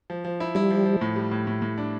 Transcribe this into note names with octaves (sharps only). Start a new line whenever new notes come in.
F3
F3
E4
G3 E4
F3
F3
A2
G3
A2
A2
A2
D4